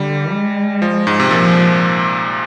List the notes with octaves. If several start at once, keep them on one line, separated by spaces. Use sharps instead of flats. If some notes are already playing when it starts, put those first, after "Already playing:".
Already playing: D3 G3
G#3
F3
G#2
C3
A#2 F3